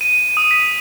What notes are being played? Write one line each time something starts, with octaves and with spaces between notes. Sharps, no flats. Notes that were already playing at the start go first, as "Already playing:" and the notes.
D#7
D#6
B6